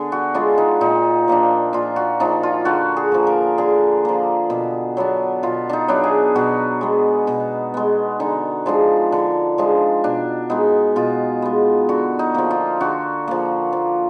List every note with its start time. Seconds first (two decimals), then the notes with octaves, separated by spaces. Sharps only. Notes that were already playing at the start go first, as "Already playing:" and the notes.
Already playing: D3 B3 D4 G#4
0.12 F#4
0.35 G#3 B3 D4 F4
0.58 D#4
0.81 A#2 D#4
1.28 F3 A#3 D4
1.73 A#2 F4
1.96 F#4
2.20 F3 A#3 D4 D#4
2.43 F4
2.65 D3 F#4
2.97 G#4
3.12 F3 A#3
3.27 A#4
3.58 D3 G#4
4.05 F3 A#3
4.50 B2
4.97 F#3 B3 D4
5.43 B2 F4
5.69 D4 D#4
5.88 F#3 B3 D4
6.04 G#4
6.35 B2 F#4
6.81 G#3 B3
7.27 B2
7.74 G#3 B3
8.20 D3 D#4
8.66 F3 G#3 D4
9.12 D3
9.58 F3 G#3 D4
10.04 B2 D4
10.50 G#3 B3 D#4
10.96 B2 F4
11.42 G#3 B3
11.89 D3 F#4
12.19 D#4
12.34 F3 A#3
12.51 F4
12.80 D3 F#4
13.28 F3 A#3
13.73 F3